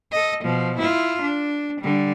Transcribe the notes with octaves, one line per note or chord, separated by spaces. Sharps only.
A4 D#5
B2 F3
E4 F4
D4
D3 G3